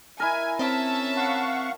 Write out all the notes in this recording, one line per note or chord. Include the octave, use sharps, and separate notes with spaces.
E4 A#4 G#5
C4 C#4 E5 A5
F5 F#5 C#6